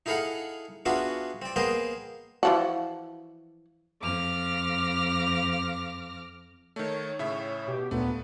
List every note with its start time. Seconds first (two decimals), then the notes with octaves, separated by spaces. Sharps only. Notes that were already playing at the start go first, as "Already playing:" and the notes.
0.06 D#4 E4 G#4 A4 F5 F#5
0.86 B3 D4 F4 F#4 G#4 E5
1.42 C4 D5
1.56 A#3 B3 G#4 C5 D#5 G5
2.43 E3 F3 F#4
4.02 F2 D6 F6 A#6
6.76 D#3 A3 C#5
7.19 A2 C#3 E5
7.67 B2 G4
7.91 D2 A#2 A3 B3